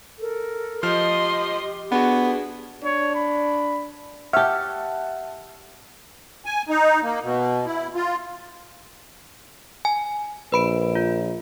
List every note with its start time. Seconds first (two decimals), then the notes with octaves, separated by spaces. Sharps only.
0.19 A4 A#4
0.83 F3 G4 C5 D#5 C6 F6
1.92 B3 D4 F#4 G#4
2.84 D4 C#5
3.14 B5
4.33 G4 C#5 E5 F#5 A5 F6
6.45 G#5
6.69 D#4
7.03 A#3
7.23 B2
7.66 E4
7.94 F4
9.85 G#5
10.52 A#1 B4 B5 D7
10.95 F4